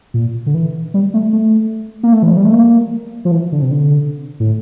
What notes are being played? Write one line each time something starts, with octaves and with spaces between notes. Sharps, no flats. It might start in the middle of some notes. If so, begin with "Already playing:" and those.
A#2
D3
E3
G3
A3
A3
A#3
A3
E3
F3
G3
A3
A#3
F3
E3
D3
C3
D3
A2